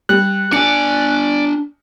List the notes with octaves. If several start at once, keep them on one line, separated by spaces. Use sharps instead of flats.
G3 F#6
D4 D5 G#5 C#7